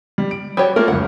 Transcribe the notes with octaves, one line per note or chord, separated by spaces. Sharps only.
G3
D7
G3 F#4 C#5
A3 A#3 F4 A#4
F#1 C#2 F#5